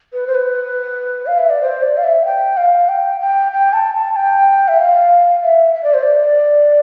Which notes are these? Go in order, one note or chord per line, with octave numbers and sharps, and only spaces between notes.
B4
C5
B4
F5
E5
D5
C5
D5
F5
E5
G5
F5
G5
G5
G5
A5
A5
G5
E5
F5
E5
E5
D5
C5
D5